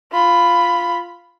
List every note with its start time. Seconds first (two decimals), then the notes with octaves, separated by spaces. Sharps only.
0.12 F4 B5